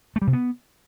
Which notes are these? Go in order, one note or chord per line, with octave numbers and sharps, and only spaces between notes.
A3
G3
C3
B3